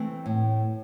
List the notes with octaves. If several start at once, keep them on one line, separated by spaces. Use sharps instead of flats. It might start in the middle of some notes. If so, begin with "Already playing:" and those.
Already playing: E3 A3 C4
A2